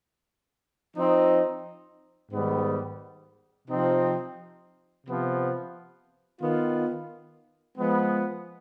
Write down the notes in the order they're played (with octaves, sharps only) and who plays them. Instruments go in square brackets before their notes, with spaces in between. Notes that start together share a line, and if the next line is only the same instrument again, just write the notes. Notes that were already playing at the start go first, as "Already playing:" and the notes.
[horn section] F3 C4 D#4
G#2 D#3 G3 B3
C3 F3 C4 D#4
C3 F3 B3
D#3 B3 F4
F3 G#3 B3